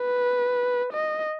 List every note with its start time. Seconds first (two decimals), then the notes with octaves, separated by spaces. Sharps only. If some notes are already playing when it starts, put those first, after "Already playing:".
Already playing: B4
0.93 D#5